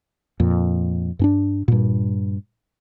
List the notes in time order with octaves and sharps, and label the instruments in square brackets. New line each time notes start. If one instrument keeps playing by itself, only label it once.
[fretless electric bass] F2 A#2
G2 C#4 D4
G2 A#2